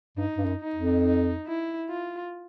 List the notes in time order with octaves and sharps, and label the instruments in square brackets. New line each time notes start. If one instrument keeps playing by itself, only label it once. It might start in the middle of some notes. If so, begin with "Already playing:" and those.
[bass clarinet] G2 [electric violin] D#4
[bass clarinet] G2
F#2
[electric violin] D#4
[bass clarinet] F2
[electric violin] D#4
E4
F4